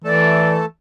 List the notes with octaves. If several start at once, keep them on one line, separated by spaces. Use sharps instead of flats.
E3 A3 A4 D5 A5